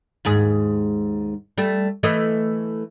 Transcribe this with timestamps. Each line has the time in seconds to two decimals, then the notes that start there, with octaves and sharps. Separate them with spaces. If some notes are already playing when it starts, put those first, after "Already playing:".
0.25 D#2 G#2 G#4
1.58 G3 A3
2.03 E3 A3 D#5